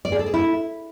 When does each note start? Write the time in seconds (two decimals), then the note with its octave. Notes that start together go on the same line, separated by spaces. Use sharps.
0.05 D5
0.12 G#4
0.19 A4
0.26 G#4
0.34 E4